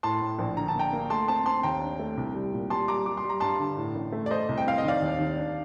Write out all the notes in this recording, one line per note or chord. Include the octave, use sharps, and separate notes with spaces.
A2 A5 C6
A2
A#1
D3 A#5
A5
A#3 G5 A#5
A#3
A3 A5 C6
C4 A5 C6
C4 A5 C6
D#2 G5 A#5
D4
A3
C2
G3
A#2
G3 A5 C6
G3 A#5 D6
G3 D6
C6
G3
A#5
G2 A5 C6
D3
A2
A1
A3
D5
A3 C5 D#5
C2
G5
C4 F5
D#5
D#3 D5 F5
D#2
D#3
D4